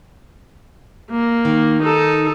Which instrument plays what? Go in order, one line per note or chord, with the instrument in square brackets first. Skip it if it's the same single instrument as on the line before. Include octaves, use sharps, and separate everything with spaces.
[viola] A#3
[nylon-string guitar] D#3
[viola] D#4 A4